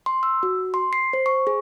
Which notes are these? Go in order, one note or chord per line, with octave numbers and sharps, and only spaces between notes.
C6
E6
F#4
C6
C7
C5
C#6
G#4